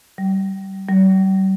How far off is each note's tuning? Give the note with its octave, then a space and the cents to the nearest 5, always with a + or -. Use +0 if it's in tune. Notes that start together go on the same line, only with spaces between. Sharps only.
G3 -30
G3 -45